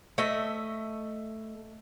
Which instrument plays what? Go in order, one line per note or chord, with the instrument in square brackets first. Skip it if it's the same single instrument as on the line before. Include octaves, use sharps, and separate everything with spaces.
[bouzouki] A3 D#5 E5